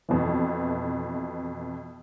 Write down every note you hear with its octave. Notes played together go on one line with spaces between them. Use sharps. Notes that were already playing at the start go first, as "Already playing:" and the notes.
F2 B2 E3